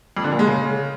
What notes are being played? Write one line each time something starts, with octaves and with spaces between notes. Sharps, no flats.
F2
D3
A#2
G#3
C#3